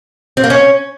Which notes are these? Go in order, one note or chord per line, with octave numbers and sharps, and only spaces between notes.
C4
A#3
C#4